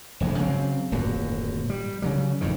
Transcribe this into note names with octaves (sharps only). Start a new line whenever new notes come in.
F1 A#1 G2
C#3 F#3 G3 C4
D1 G#1 F#2 A#2
G3
C#3 F#3 G3
F#1 F2 A2 D#3